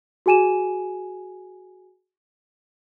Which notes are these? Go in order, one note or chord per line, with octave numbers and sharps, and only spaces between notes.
F#4 G#4 G#5 D#7 E7